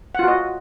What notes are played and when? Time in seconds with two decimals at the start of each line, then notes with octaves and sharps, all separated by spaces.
0.15 F#5
0.19 F4
0.24 F#4
0.28 D#5